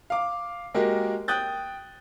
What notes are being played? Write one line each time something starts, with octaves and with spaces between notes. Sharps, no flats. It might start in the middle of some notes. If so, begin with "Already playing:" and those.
F5 D6
G#3 A#3 F#4 G4 A#4
G5 D#6 F#6 G6 A6